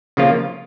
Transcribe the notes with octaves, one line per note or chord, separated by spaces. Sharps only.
C#3 F3 A#3 F4